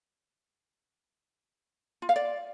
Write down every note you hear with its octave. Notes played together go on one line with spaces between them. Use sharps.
F4
F5
D5